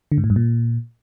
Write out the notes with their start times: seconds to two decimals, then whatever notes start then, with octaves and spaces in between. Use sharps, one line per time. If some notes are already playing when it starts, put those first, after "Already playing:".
0.12 D3
0.18 G#2
0.24 A2
0.30 G2
0.36 A#2